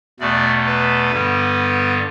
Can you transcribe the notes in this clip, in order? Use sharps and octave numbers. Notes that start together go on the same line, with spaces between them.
E2 B2 A3 D5
B4
G2 D3 G3 B3